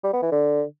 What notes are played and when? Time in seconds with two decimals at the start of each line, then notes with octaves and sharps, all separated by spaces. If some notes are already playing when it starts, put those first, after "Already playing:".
0.04 G3
0.13 B3
0.22 E3
0.32 D3